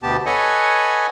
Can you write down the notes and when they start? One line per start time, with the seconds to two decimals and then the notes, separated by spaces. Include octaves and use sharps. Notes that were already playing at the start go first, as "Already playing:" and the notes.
0.03 D2 B2 B3 G4 A5
0.26 A4 B4 C#5 D#5 F#5 G#5